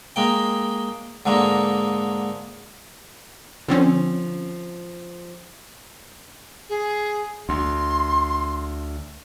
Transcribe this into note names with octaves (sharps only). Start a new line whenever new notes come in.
G#3 A#3 G5
G#2 D3 G#3 A#3
D3 F3 C4 C#4
G#4
D2 C6